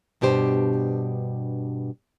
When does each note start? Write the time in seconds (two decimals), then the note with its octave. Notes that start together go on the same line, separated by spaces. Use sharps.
0.21 G2 B2 D4 G4 C5